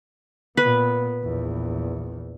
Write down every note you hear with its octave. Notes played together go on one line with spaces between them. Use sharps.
A#2 B3 B4
A#1 E2